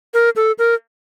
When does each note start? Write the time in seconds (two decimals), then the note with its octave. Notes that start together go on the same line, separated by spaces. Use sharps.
0.14 A#4
0.36 A4
0.59 A#4